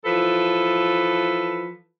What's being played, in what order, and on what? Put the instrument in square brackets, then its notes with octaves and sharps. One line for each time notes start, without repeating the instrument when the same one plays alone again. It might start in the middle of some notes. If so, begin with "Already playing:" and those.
[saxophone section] E3 F3 A4 B4